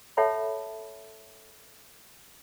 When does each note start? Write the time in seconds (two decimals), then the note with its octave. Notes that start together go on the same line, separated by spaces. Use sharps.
0.17 A4 C#5 E5 F#5 A5 B5